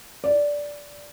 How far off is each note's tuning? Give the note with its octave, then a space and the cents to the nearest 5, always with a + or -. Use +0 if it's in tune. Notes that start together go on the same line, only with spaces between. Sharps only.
D5 -10